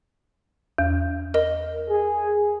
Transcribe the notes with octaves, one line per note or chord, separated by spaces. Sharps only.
E2
A#4 D#5
G#4